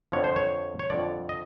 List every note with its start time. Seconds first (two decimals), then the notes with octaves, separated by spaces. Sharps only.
0.12 F2 D3 F3 C#5
0.24 C5
0.36 C#5
0.79 C#5
0.90 F2 D3 F3 D5
1.29 D#5